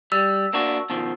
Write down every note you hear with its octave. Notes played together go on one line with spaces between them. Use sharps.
G3 E6
A#3 D4 F#4
B2 D#3 F3